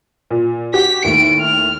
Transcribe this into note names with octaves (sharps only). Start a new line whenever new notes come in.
A#2
F#4 G4 B6
D#2 A2 D#3 D7
F6